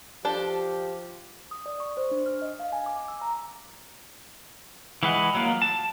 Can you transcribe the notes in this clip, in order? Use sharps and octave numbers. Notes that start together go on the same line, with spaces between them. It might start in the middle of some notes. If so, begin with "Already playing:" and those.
F3 D4 G4 A4 G5
D#6
D5
C#6
C5
D4
F6
D#5
F5
G#5
D6
E6
A#5
E3 G#3 B4 D#5 F#5
F#3 A#3 F4
A5